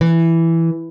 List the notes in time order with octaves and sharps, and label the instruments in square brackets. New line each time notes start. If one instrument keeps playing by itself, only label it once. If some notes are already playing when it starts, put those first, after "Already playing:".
[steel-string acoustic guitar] E3